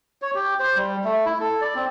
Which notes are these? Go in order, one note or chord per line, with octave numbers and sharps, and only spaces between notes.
C#5
G4
C5
G3
A3
E4
A4
D5
C4